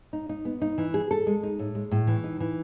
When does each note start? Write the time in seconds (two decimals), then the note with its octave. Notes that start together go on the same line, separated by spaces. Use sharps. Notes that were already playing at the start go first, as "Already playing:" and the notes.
0.13 D#4
0.29 D#4
0.45 B3
0.62 D#4
0.78 E3
0.94 G#4
1.11 A4
1.27 G#3
1.43 D#4
1.59 A2
1.75 G#3
1.92 A2
2.07 E3
2.24 D#4
2.40 E3